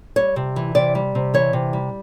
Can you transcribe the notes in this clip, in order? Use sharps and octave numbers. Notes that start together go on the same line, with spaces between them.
G3 C#5
C3
E3
C3 D5
G3
C3
E3 C#5
C3
G3